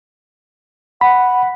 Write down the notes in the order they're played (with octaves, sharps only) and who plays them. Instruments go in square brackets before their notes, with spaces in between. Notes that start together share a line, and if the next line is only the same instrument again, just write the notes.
[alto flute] F#5 [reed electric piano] B5